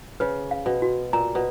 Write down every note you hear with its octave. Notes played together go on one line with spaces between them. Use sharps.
C#3 B4
F5
B2
F#4
A#2 A#5
B2